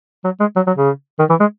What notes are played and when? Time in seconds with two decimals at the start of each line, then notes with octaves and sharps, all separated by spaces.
0.24 F#3
0.40 G#3
0.56 F#3
0.67 F#3
0.77 C#3
1.19 D#3
1.30 E3
1.40 G#3